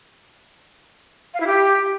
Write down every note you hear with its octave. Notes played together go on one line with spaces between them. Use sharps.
F5
E4
G4